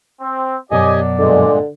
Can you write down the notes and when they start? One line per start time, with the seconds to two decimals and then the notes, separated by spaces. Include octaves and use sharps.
0.21 C4
0.71 F#2 B2 F#3 G4 D5 D#5 G#5
1.19 G2 A#2 D3 G#3